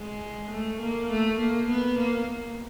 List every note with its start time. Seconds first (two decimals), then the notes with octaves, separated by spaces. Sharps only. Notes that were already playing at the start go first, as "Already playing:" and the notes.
Already playing: G#3
0.51 A3
0.80 A#3
1.10 A3
1.39 A#3
1.68 B3
1.98 A#3